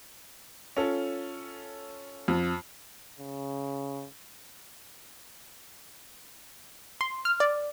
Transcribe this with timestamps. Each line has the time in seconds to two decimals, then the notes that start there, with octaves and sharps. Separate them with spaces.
0.77 C#4 F4 A4
2.28 F2
3.19 C#3
7.01 C6
7.25 F6
7.40 D5